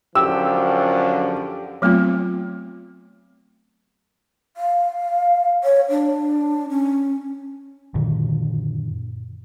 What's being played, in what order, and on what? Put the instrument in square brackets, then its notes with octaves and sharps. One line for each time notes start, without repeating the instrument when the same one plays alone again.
[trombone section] F#2 D3 F3 [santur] G4 [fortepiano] E6
[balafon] F#3 A3 B3 C4 F4
[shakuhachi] F5
C#5
D4
C#4
[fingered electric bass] F#2 A#2 D3 D#3